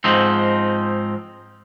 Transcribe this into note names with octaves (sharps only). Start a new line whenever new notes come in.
G#2 F3 C4 D#4